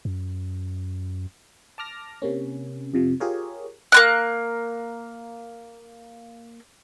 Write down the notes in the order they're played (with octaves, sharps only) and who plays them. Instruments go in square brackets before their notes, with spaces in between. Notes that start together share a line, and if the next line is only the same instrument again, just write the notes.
[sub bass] F#2
[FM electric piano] A5 D6 F6 A#6
C3 A#3 C#4
F2 C3 F3
F4 G4 G#4 A#4 C#5
[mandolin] A#3 C4 F#6